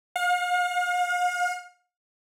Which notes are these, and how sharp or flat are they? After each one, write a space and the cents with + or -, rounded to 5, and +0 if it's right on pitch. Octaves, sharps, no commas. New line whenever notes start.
F5 +40